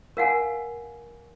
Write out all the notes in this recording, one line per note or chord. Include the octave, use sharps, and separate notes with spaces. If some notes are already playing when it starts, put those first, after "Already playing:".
A#4 F5 F#5 G#5